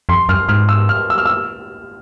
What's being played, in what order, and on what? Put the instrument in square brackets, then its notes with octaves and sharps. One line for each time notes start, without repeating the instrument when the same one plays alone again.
[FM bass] F2 [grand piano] C6
[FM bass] F#2 [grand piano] F6
[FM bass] G#2 [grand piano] F6
[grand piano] E6
F6
E6
F6
E6